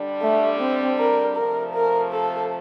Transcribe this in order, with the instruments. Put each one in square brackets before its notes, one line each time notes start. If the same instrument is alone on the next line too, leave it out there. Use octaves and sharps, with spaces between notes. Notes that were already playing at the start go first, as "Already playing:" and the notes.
Already playing: [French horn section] D3 G3 D4
[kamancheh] A3
C4
A#4
[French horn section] C3 F3 A3 [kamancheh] A#4
[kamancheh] A#4
A4